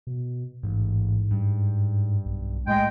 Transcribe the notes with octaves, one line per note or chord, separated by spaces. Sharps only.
B2
A1 G#2
G2
B1
A2 G#3 G5